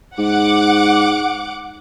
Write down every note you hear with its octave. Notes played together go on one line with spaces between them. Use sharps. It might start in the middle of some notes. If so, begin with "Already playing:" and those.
G#2 F#5 D6